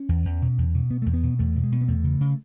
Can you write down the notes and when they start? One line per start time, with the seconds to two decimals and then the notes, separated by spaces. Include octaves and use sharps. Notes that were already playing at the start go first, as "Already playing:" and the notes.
Already playing: C#4
0.09 E2
0.25 E2
0.42 B2
0.58 E2
0.74 B2
0.90 B2 B3
1.02 E2 A3
1.13 B3
1.23 B2
1.39 E2 A3
1.56 B2
1.63 G#3
1.72 B2
1.81 B3
1.88 E2 A3
2.04 C#3
2.21 C#3